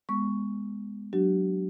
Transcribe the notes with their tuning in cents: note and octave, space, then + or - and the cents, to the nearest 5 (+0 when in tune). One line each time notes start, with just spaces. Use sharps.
G#3 -10 B3 +0 C#6 +5
F#3 +0 D4 +0 G4 -45